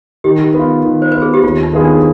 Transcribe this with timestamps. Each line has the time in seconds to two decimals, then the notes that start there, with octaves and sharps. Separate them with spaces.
0.24 D#3 G4
0.54 B3 F4
0.84 D#3
1.02 C5
1.12 B3 F4 B4
1.22 G#4
1.34 G4
1.43 D#2 F4
1.63 D#4
1.73 D#3 B3 F4 G#4
1.84 D4